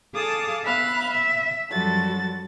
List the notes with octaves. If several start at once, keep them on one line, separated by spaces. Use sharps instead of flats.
G#4 A4 F5 A5 D6 D#6
B3 E5 F5 B5 F#6
E5
F#2 F3 G3 F#4 A4 A6